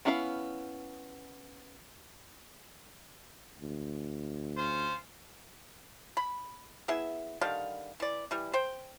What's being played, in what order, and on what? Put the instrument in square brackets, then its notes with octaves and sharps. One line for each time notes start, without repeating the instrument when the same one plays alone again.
[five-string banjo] B3 C#4 E4 C5 F5
[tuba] D2
[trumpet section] C#4 F4 C5
[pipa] B5
B3 E4 G#4 E5
D3 D#3 G3 F5
E3 D5
E3 G3
C5 G5